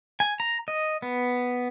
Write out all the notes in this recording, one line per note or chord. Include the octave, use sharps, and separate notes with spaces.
G#5
A#5
D#5
B3